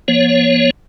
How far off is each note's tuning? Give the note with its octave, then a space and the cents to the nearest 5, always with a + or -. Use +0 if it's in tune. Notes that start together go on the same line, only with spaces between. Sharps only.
F3 -20 B3 -45 C#5 +0